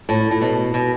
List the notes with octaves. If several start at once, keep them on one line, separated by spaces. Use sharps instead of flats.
A2
A2
B2
B2